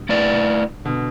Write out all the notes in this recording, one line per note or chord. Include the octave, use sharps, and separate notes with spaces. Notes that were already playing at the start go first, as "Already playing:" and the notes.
Already playing: G2 B2
A3 E4 B4 D5
B2 D3